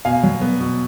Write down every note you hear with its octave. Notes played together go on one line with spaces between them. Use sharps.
B2 F5 G#5
F#3
B3
B2